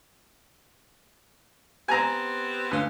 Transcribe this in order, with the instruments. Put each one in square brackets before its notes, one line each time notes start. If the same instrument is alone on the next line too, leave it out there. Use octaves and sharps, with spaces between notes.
[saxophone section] B3 C4 G4 [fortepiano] G#5 A#5
[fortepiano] D2 [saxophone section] C#4 F4 B4